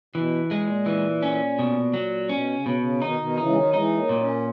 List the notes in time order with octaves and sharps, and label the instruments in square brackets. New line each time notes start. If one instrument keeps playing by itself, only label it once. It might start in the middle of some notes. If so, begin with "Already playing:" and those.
[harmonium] B2 [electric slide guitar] E3
[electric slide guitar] G#3
[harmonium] A#2
[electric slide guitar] E3
C#4
B2
F#3
[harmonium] B2 [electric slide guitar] C#4
[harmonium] C#3
[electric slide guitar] B2
[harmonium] C#3
[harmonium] B2 D#3 [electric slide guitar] D#4
[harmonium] B2 D#3
[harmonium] C#3 E3 [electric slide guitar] D#4
[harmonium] G#3
D#3 F#3
[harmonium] E3 G#3 [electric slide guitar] D#4
[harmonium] F#3 A#3
[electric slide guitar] A#2
[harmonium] A#3 C#4